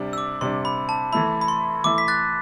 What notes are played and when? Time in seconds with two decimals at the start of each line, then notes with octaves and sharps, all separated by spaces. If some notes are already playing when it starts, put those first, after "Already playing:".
Already playing: C3 G3 D4
0.13 E6
0.18 D6
0.41 C3 G3 D4 C6
0.65 B5
0.89 A5
1.13 E3 A3 E4 B5
1.41 B5
1.48 C6
1.84 E3 A3 E4 D6
1.98 B6
2.08 F#6 A6